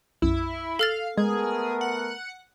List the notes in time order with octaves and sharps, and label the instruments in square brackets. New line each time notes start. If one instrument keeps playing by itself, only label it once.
[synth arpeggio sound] B1 F#2 [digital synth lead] E4
[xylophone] A4 F6 A6 [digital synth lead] F5
[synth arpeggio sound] G#3 [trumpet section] A3 B3 A#4 [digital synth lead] G#4
[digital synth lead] F#5